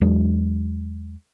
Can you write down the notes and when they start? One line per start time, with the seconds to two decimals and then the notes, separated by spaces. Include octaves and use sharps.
0.01 E2 F#3 G#3 D4